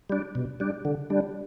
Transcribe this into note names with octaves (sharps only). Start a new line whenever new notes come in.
G3 D4
B2
G3 D4
D3
G3 D4